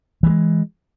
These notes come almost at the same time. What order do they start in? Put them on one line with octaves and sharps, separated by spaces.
E3 G3 G#3